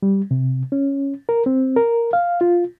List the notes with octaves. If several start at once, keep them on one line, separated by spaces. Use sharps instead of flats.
G3
C3
C#4
A#4
C4
A#4
F5
F4